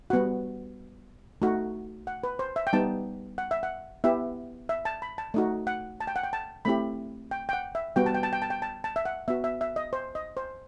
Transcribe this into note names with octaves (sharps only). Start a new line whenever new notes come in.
G3 B3 F#4 F#5
A3 D#4 F#4
F#5
B4
C5
E5
G5
G3 B3 D#4 A5
F#5
E5
F#5
B3 E4 G4 E5
E5
A5
B5
A5
A3 D#4 F#4
F#5
A5
G5
F#5
G5
A5
A3 C4 E4 G4 B5
G5
G5
F#5
E5
G3 B3 F#4 G5
A5
G5
A5
G5
A5
G5
A5
A5
E5
F#5
B3 F#4 E5
E5
E5
D#5
C5
D#5
C5